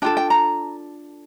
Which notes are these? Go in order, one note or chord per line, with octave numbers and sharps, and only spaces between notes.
D4 F4 A4 G5
G5
A#5